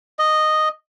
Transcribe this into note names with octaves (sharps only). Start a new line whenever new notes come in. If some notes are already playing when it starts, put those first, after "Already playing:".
D#5